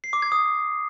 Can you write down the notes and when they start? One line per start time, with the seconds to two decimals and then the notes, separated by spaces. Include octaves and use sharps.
0.04 C7
0.13 D6
0.22 G#6
0.32 D#6